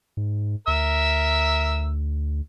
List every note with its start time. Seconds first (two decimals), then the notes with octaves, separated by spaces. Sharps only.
0.17 G#2
0.68 D2 A#4 E5 E6